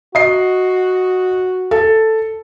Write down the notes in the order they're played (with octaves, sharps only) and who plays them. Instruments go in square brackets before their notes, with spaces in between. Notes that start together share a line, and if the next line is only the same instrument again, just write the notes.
[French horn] F#4 [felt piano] D#5 C7
[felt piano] A4